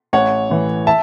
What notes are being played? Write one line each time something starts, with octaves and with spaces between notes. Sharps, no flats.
A1 C#5 F#5
A2 E3
E5 A5